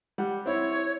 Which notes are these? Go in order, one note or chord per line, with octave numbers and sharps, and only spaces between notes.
G3 F#5
C4 E4 C#5